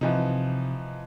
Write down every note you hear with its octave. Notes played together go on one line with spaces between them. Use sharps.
C3 E3 F3 D#4